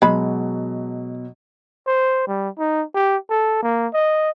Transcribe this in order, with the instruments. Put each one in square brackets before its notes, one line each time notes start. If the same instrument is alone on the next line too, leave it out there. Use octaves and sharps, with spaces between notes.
[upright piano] B2 F#3 [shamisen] G#3 B5
[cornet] C5
G3
D#4
G4
A4
A#3
D#5